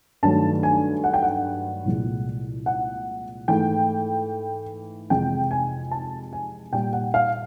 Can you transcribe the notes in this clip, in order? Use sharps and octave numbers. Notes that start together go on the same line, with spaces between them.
G2 D#3 F#3 A3 A5
G#5
F#5
G5
F#5
C2 A#2 F3 G#3
F#5
G#2 E3 A3 G5
F2 C3 E3 G#3 G5
G#5
A5
G#5
A#2 G3 G5
F#5
F5